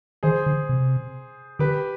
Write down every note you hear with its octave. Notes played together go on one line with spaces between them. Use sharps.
D#3 G#4 C5
D3
C3
D3 G4 B4